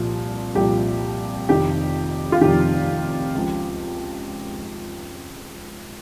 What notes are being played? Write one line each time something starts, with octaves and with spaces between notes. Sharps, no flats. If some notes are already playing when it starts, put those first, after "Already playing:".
Already playing: C2 A#2 F3
C2 A#2 F3 G4
F1 F2 C3 D#3 G4
F4
F1 F2 C3 D#3 G4
C#2 C#3 F3